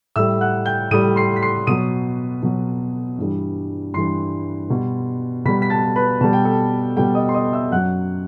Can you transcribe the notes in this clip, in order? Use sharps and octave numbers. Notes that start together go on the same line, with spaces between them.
A2 G3 E5 E6
F#5 F#6
G5 G6
A2 G3 D#6 D#7
C6 C7
B6
C6 C7
B2 F#3 D#6 D#7
B2 F#3
G2 E3 G3
G2 E3 G3 C6 C7
B2 G3
B2 G3 B5 B6
B6
A5 A6
B4 B5
B2 G3 A5
G5
A4 A5
B2 G3 G5
D#5 D#6
C6
D#5 D#6
E5 E6
F#2 F#3 F#5 F#6